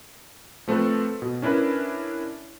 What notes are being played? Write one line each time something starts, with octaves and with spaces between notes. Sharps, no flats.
F3 A3 C4 A4 B4
B2
C#4 D4 E4 A#4 B4